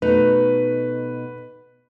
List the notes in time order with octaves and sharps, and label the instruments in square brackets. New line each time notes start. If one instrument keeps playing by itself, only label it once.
[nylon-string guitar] B2 A3 D#4 [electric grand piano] B4